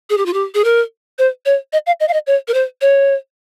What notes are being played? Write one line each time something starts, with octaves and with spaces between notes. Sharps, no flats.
G#4
G4
F4
G4
G#4
A#4
C5
C#5
D#5
F5
D#5
F5
D#5
C#5
A#4
C5
C#5